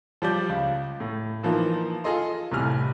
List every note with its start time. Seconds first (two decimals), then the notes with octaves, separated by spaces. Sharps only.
0.22 F3 G3 D5 G6
0.49 C#2
1.00 A2
1.43 E3 F3 A#3 D#4 F4
2.04 F4 G#4 A4 D#5 C6
2.52 C2 A2 C3 G#5 F6